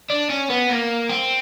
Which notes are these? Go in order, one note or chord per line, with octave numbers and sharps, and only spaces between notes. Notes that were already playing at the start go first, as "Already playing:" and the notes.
D4
C#4
B3
A#3
C4